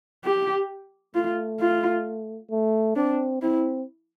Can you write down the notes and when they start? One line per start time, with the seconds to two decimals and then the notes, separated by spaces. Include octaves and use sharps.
0.24 G4
1.15 A3 F4
1.61 F4
2.51 A3
2.96 C4 D4
3.42 C4 E4